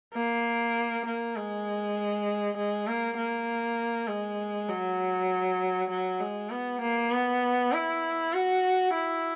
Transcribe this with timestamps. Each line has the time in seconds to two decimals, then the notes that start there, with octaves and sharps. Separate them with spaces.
0.14 A#3
1.05 A#3
1.36 G#3
2.57 G#3
2.87 A#3
3.17 A#3
4.08 G#3
4.69 F#3
5.90 F#3
6.20 G#3
6.51 B3
6.81 A#3
7.11 B3
7.72 E4
8.33 F#4
8.93 E4